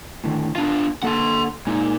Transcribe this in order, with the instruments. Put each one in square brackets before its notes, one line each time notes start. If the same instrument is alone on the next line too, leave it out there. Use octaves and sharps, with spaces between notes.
[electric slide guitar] A2 D3 D#3
[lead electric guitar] B3 F4 [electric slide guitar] D4 F5
[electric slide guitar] D3 A#3 A4 [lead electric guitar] F#5 C6
[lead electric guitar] A#2 [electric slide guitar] G#3 D#4